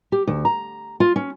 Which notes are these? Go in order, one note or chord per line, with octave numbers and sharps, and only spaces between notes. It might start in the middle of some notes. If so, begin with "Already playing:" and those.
G4
D2
A#5
F4
C#4